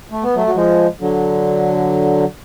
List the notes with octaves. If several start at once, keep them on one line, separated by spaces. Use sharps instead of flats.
A3
B3
F#3 A3
F#3
F3 G#3
D3 F#3